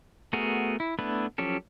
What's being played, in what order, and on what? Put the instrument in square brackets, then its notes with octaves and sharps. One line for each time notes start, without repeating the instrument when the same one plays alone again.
[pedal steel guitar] A3 B3 F#4 G#4 A#4
E4
A3 B3 D4 E4 B4
F3 F#3 C#4 G4 A4